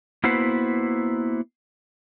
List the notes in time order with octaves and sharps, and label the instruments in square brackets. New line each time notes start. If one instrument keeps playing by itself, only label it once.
[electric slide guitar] A#3 B3 E4 F#4 B4 C5